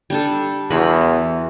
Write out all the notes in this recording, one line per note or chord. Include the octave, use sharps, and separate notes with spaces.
G3 D4 A4
E2 E3 F#4 B5